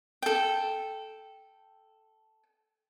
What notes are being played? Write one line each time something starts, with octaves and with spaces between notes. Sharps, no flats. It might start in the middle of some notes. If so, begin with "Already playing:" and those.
A4 G5